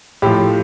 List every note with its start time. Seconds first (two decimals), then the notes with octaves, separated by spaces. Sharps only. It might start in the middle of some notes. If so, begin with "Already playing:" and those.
0.22 A2 F3 G4